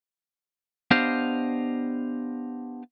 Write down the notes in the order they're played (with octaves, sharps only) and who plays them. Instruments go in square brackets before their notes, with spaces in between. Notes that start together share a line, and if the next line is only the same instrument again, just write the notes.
[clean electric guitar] B3 D4 G4 C5 D#5 F5